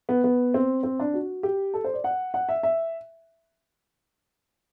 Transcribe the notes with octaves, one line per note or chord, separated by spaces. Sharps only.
B3
B3
C4
C4
D4
F#4
G4
A4
C5
D5
F#5
F#5
E5
E5